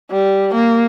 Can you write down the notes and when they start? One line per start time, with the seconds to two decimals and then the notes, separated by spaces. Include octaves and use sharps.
0.11 G3
0.54 A#3